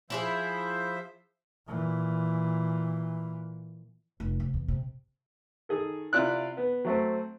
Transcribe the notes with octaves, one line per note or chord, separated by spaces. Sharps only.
F3 E4 F#4 G#4 C5 E5
A#2 E3
F1
C3
E2
C3
D#3 G#4 A4
C3 E4 F4 D5 F#6
B3
F#3 A3 C4